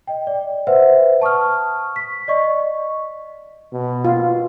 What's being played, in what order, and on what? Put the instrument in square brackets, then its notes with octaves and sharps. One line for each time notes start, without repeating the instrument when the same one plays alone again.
[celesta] D#5 G5
D5
B4 C5 E5 F#5
A5 C#6 D#6 F6
C#6 B6
D5 D#5 C#6
[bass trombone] B2
[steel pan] F4